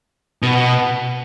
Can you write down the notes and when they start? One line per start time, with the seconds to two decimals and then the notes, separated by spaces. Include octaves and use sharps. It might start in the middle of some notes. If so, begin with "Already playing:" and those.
0.42 B2